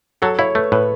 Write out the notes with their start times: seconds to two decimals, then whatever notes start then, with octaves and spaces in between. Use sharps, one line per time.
0.22 F#3 A4
0.39 E4 C#5
0.55 A3 B4
0.72 A2 B4